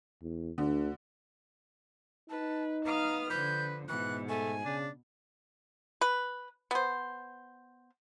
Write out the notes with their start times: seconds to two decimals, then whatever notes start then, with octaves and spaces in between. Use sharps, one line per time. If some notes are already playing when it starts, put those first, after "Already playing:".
0.22 E2
0.58 D2 D3
2.30 D#4 B4 A5
2.86 B3 F5 A#5 D#6 F6
3.30 D3 F3 B4 G6
3.89 G#2 B2 E3 F#6
4.29 A3 G#5
4.65 C#3 D4
6.01 B4
6.71 B3 C5